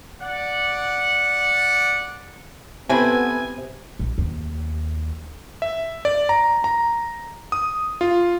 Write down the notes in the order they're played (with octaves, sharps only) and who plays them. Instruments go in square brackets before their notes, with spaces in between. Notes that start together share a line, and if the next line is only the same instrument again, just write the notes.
[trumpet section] D5 F#5
[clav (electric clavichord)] C3 [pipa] A3 C4 E4 [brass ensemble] B3 [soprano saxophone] G#5
[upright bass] A#1
D#2
[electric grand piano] E5
D5
A#5
A#5
D#6
F4